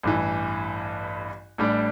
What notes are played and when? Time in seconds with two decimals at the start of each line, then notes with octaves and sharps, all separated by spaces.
0.03 A1 G2 E3
1.58 A1 A2 G3 D4